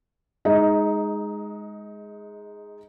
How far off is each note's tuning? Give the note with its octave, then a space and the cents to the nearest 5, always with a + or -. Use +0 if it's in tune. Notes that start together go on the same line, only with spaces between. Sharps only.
G#3 +0 D#4 +0 D#5 +25